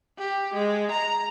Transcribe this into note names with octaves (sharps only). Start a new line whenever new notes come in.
G4
G#3
A#5